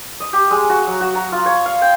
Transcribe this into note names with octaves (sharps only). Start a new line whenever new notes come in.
D#5
G4
G#3
F#4
F#3
F#4
A#5
F4
C#5
F5
G5